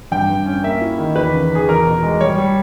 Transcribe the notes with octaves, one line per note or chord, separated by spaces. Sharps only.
G2 G5
G2
C#4
A#3 E5
E4
D#3
E2 B4
C#3
E2 G#4
E2 A#4
B2
G#3
G3 C#5
G3